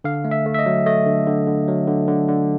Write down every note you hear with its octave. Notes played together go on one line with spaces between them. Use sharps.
D3 F5
A3
E5
A3
E5
D#5
F#3
A3 D#5
D3
D3
D3
F#3
D3
D3
D3